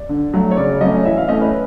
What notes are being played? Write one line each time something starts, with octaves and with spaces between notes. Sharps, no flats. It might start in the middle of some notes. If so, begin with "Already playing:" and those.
Already playing: D5
D3
F#3 A3
C#5
C#3 D5
F#3 A3 C#4 D#5
E3 E5
F5
A3 C#4 D#5
B4